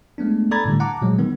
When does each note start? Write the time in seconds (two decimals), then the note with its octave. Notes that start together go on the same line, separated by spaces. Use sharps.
0.18 G#3 A3 B3 D4
0.51 A4 D5 A#5 B5 G#6 A6
0.66 A2 D3 G3
0.80 F#5 A5 A#5 D6
1.02 A#2 F3 F#3 G#3
1.19 D#3 G3 B3